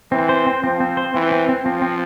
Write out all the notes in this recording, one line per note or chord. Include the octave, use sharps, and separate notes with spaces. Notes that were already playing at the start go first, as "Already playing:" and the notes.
E3 C4
C5
C4
F3 C4
C4
C5
E3 C4
C4
C4
F3 C4
C4